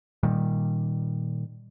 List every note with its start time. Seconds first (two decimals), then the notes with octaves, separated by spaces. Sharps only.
0.23 A#2 D#3 G3